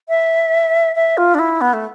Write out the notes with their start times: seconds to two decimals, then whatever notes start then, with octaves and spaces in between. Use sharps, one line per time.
0.09 E5
0.95 E5
1.18 F4
1.35 D4
1.39 E4
1.61 B3
1.73 A3